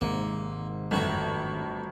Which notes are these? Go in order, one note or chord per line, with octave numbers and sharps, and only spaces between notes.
G#1 G#2 C3 A#3
G1 F2 A3 F#4 A#5